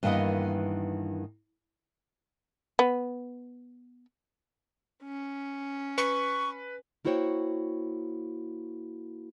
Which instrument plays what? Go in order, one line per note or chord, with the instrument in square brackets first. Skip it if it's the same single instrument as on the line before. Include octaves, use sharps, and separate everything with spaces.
[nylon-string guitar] G2 D#3 E3 A#3 B3 D#5
[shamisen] B3
[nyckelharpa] C#4
[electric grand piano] B4 [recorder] C#6
[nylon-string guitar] A#3 E4 F#4 C5 C#5 G5